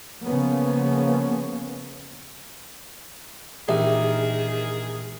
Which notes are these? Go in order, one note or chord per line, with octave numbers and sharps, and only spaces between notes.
C#3 F3 A#3 B3 C#4
A#1 D#3 E3 G4 G#4 E5